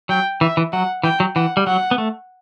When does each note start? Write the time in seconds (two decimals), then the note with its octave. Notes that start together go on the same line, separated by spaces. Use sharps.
0.09 F#3 G5
0.41 E3 E5
0.57 E3
0.73 F#3 F#5
1.03 E3 G5
1.20 F#3
1.36 E3 F#5
1.57 G3
1.67 F#3 F#5
1.91 B3
1.98 A3